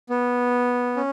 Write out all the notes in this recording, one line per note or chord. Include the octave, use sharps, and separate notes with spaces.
B3
C#4